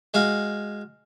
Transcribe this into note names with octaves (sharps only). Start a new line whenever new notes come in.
G#3 F#4 F5